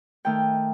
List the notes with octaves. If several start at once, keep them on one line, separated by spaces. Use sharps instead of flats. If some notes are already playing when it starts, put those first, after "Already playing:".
D#3 A3 G5